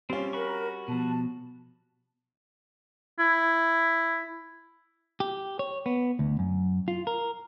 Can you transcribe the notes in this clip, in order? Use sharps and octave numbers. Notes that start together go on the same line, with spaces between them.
G3 C4 C#4 F4
F#4 A#4 B5 C#6
B2 F3 A5
E4
G4
C#5
B3
D2
F#2
F4
A#4